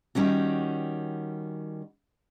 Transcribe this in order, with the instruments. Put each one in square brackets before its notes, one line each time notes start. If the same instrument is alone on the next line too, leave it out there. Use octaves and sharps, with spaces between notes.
[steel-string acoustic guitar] D#3 G3 C#4 F#4